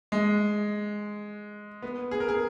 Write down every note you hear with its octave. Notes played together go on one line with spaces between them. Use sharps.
G#3
B3
G#4
A#4
G#4